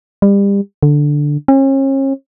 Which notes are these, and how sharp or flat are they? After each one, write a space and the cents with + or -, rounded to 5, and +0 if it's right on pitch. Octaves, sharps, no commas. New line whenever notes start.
G3 +30
D3 +0
C#4 -40